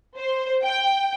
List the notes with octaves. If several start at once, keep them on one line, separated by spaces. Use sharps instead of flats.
C5
G5